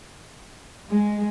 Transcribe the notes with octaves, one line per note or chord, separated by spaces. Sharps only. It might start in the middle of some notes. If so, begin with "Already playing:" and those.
G#3